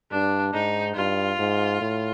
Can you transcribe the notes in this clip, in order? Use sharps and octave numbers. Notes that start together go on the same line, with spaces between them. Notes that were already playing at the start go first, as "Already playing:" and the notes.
G2 D4
G#2 D#4
G2 F4
G#2
A2